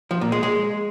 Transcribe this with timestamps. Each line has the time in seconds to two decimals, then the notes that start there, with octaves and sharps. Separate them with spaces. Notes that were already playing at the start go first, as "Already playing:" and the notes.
0.11 F3
0.21 A#2
0.32 G#3
0.43 G#3